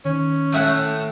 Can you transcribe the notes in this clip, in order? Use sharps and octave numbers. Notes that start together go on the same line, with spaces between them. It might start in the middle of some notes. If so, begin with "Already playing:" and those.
D#3 C#4
A2 E5 F#5